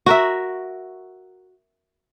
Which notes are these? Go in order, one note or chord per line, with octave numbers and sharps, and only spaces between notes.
F#4 A#4 E5